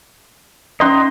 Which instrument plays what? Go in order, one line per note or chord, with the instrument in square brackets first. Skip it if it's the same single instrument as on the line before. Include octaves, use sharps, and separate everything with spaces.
[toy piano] C#4 D5 [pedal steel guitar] D#4 C6